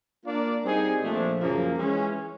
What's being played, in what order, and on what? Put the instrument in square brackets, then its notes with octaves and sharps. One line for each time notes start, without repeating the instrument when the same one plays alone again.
[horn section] A#3 D4 F4 A#4 D5
G3 C4 D#4 G#4
A#2 F3 A3 D4
F#2 C#3 F3 A#3
E3 G#3 C#4